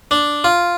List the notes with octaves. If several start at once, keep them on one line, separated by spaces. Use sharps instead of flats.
D4
F4